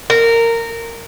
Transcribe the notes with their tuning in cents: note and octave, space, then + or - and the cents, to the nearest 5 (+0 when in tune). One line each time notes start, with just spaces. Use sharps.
A#4 -15